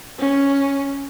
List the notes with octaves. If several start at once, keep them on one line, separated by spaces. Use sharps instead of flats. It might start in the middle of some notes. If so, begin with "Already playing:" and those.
C#4